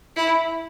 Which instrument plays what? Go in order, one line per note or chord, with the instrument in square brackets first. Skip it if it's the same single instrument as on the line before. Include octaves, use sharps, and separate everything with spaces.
[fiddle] E4